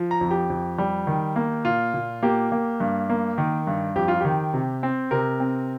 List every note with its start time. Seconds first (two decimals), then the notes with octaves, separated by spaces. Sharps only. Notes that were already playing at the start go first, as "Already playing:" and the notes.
Already playing: F3
0.11 A#5
0.21 F2
0.31 G4
0.50 F2
0.78 G3
1.07 D#3
1.36 A#3
1.65 A#2 F4
1.94 A#2
2.23 A#3 G4
2.52 A#3
2.80 G2
3.09 A#3
3.38 D#3
3.67 G2
3.95 F2 G4
4.08 F4
4.20 D#3 G4
4.54 C3
4.83 C4
5.11 C3 A#4
5.40 C4